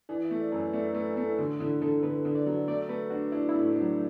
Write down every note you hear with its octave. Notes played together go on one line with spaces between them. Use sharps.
E3 D5
E5
A3
D5
F#2
B4
A3 D5
A4
A3 B4
A3 A4
E4
D3 F#4
D3 E4
D3 A4
D3 B4
D3
D5
F#3
A3 D5
A3 B4
D4 F#4
D4 E4
E4
A2
A3
D4
F#3